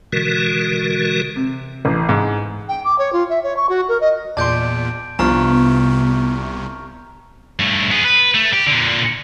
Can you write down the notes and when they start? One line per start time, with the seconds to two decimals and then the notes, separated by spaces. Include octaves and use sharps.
0.13 B2 D3 E3 G#3 F#4 A#4
1.36 C3
1.85 A1
2.09 G#2
2.69 G5
2.84 D6
2.98 C#5
3.13 F4
3.29 E5
3.43 C#5
3.57 C#6
3.69 F#4
3.88 A#4
4.00 D#5
4.37 E2 A#2 D5 A5 C6 G6 D7
5.19 C2 G2 C3 F3 B3 A#5 C#6 F6
7.59 G2 A3
7.91 B3 G#4
8.05 B4
8.34 A3
8.53 G4
8.67 A#2 D3